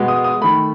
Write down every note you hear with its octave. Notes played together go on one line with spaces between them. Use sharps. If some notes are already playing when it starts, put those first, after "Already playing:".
Already playing: B2 G#3 B3
D#6
D#6
D#3 A3 B5